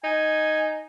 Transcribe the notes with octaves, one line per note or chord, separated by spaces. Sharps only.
D#4 G#5